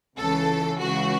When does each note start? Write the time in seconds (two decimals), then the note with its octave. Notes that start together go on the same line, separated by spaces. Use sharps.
0.17 C#2 C#3 E3 A4
0.79 C#2 C#3 E3 F#4